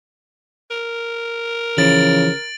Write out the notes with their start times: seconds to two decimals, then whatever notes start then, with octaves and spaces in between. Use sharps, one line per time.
0.71 A#4
1.78 C#3 E3 F3 A6 D7 F#7